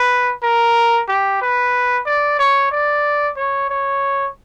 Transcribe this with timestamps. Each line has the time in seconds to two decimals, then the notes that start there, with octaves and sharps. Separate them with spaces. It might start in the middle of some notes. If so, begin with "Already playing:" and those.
Already playing: B4
0.43 A#4
1.08 G4
1.41 B4
2.06 D5
2.39 C#5
2.71 D5
3.37 C#5
3.69 C#5